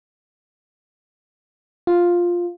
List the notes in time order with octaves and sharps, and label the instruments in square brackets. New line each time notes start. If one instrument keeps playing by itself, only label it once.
[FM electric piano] F4